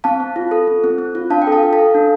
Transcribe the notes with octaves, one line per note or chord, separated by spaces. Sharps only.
C4 F5 A5
C4
F4
A4
C4
C4
C4
F4
D4 F5 A5
G5
A4
F5 A5
A4
F5 A5
A4
D4